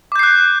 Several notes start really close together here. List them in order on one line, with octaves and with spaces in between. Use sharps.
D6 G6 C7 F#6